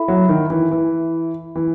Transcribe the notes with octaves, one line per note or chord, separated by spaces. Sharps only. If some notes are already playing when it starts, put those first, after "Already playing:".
Already playing: E4 A4 E5 B5
F#3
D#3
E3
E3
E3